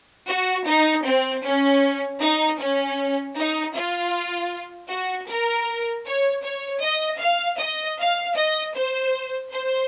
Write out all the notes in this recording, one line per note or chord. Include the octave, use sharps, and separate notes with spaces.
F#4
D#4
C4
C#4
D#4
C#4
D#4
F4
F#4
A#4
C#5
C#5
D#5
F5
D#5
F5
D#5
C5
C5